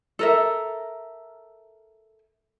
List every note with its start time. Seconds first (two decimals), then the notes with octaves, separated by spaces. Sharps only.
0.19 A4 A#4 E5